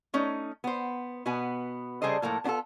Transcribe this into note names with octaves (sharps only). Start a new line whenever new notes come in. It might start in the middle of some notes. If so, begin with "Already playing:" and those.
A3 C#4 D#4
B3 C5
B2 B3 B4 G#5
C#3 G3 G#4 A4 C5 D#5
A2 F3 A#3 A4
B3 D4 D#4 F4 A4